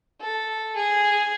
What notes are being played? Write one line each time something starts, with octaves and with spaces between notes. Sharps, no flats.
A4
G#4